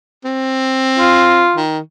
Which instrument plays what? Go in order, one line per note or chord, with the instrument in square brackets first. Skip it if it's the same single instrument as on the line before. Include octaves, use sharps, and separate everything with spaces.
[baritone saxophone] C4
[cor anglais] F4
[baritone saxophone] D#3